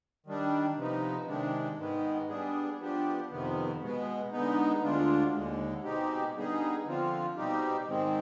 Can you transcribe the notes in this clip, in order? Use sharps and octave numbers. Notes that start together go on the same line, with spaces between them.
D#3 G3 D4
C3 F3 B3 D#4
C3 D#3 G#3 D4
G#2 D#3 G#3 B3
G3 B3 D4 G#4
F3 B3 D4 G4
F2 C3 D#3 B3
B2 G#3 B3
D3 G#3 B3 D#4
D2 D3 G#3 D4 F4
D#2 D3 G#3
B2 G#3 C4 D#4 G4
D3 G3 B3 D#4 G#4
D3 F3 C4 F4
B2 G3 C4 D#4 G4
G#2 D#3 G#3 C4